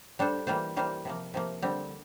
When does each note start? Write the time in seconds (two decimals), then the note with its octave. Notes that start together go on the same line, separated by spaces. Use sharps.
0.19 G3 D4 A4 C5
0.47 E3 G3 A#3 F4 C5
0.76 E3 G3 A#3 F4 C5
1.05 C3 F3 A#3
1.34 C3 F3 A#3
1.62 D3 G3 C4